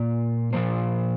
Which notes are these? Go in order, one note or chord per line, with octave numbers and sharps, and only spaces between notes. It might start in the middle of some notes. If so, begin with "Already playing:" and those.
Already playing: A#2 A#3
A#2 F3 A#3 C5